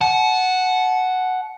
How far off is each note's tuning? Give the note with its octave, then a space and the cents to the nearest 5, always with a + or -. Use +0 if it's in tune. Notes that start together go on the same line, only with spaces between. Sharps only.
F#5 +0 A5 -30